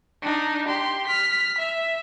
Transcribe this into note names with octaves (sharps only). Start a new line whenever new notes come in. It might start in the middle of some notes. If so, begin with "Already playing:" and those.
D4 D#4
G4 C6
F6 B6
E5